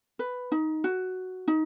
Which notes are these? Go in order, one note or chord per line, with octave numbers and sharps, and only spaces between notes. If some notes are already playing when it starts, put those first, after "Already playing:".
B4
D#4
F#4
D#4